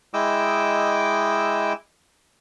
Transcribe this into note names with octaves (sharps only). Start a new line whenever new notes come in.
G#3 E4 D#5 G5 D6 E6